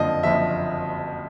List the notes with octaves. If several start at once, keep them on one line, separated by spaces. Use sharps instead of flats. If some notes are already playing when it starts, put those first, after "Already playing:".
Already playing: F#1 F2 D3 F3 D#5
F#1 F2 D3 F3 E5